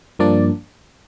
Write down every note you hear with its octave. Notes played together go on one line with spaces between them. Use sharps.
G2 F3 A#3 D4 D5